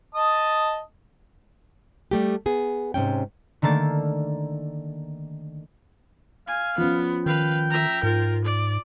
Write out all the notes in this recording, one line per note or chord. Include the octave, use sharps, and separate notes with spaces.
D#5 A5 D#6
G3 A3 G4
B3 G#4
G#2 C3 C#4 G5
D3 D#3 A3 A#3 A6
F5 G#5
F3 B3 C#4
D#3 B4 F5 G5
E5 A#5
G#2 F4 A#4
D5